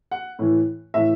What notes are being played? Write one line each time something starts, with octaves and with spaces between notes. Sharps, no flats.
F#5
A2 E3
A2 E3 E5